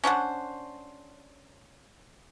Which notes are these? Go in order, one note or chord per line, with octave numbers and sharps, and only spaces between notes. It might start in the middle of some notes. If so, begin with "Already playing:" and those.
C#4 D4 C5 F#5